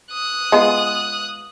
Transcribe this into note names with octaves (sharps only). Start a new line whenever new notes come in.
D#6 F#6
G#3 B3 F4